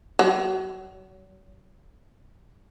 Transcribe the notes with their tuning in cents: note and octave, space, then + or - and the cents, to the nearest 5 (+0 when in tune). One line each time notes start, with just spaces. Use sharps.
F#3 +35